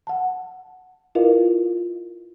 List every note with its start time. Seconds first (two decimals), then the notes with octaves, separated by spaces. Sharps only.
0.07 F#5 A5
1.15 E4 F4 A#4 B4 D#5 F5